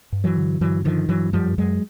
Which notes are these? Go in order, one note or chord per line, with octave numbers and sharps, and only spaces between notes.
G2
E3 F#3
D3
G2 E3 F#3
D3 D#3 F3
G2 E3 F#3
F#2 F3 G3
F#2 F#3 G#3